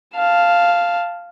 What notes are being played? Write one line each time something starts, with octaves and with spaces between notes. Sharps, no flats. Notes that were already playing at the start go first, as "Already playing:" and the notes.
F5 A5